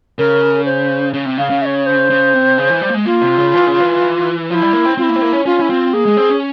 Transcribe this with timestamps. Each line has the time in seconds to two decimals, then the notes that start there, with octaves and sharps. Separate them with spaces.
0.18 C#3 A#4
0.65 C5
1.14 C#3
1.25 C3
1.38 C#3 F5
1.50 C#3
1.62 E5
1.66 C#5
1.86 C5
2.10 C#3
2.34 C3
2.58 C#3
2.70 E3
2.81 G3
2.90 A#3
2.94 G#3
3.06 A#3 F4
3.21 C3
3.38 C#3
3.54 E3
3.67 C#3
3.80 E3
4.50 F3 F4
4.54 E4
4.62 G3
4.73 A#3
4.86 C4
4.97 C4 F4
5.03 E4
5.09 A#3
5.16 C4
5.22 A#3
5.33 C#4
5.46 C#4 F4
5.60 C#4 E4
5.70 C4 F4
5.93 A#3 G#4
6.05 G#3
6.17 C4
6.30 C#4